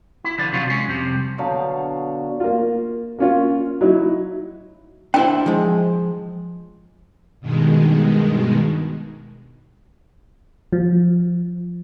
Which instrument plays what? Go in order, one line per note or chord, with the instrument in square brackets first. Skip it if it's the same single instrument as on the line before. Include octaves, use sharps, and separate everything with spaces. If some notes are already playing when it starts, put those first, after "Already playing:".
[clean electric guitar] E4
D3 F3 D5
C3 F3 F#3 C#4 F4
G#3 C#4
F2 C3 G3
[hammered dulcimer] B2 D3 F#3 F5
[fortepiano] A#3 F4
A#3 C#4 F4
F#3 D#4 E4
[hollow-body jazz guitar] D4 E4 C5 [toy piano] G5
[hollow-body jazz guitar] F3 G#3
[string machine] G2 B2 D#3 G#3
[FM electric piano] F3